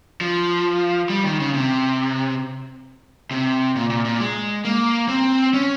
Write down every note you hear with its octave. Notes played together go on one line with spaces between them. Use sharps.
F3
G3
D#3
C#3
C3
C3
A#2
A#2
A#2
G#3
A#3
C4
C#4